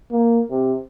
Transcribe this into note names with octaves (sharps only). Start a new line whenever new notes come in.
A#3
C3